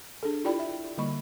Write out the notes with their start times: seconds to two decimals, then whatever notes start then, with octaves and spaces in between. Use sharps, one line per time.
0.23 D4 G#4 A4
0.45 E4 F4 G4 D5 G5 B5
0.59 E5
0.97 D3 G3 A#3 D#5 B5 C#6